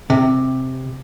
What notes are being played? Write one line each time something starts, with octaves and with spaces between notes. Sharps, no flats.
C3